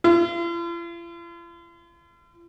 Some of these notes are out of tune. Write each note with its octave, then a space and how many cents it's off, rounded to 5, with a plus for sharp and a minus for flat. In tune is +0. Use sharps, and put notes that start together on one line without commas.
F4 -45